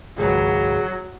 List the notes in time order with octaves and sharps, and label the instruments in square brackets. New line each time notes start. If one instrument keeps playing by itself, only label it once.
[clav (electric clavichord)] G#1 C#2 [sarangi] F#3 [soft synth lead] G#4